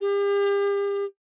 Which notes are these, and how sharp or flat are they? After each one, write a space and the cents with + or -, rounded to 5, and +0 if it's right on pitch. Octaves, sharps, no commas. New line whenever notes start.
G4 +40